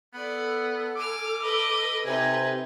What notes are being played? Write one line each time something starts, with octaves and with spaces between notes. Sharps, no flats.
B3 A4 D5 B5
G#5 D6 F6
B4 D#5
C3 D#4 B4 G#5